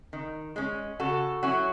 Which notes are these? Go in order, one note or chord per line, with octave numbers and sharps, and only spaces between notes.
D#3
G#3 C#4
C#3 F#4 A4
F#3 C#4 E4 F#4